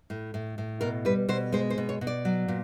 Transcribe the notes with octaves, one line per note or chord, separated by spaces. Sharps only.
A2
A2
A2
B2 A#4
G3 B4
B2 C5
G#3 C5
C5
B2
C#5
B2
D5
F#3
A#2